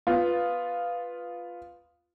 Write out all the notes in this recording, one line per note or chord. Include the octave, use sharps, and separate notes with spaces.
B3 F4